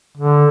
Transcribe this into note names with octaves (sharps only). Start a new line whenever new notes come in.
D3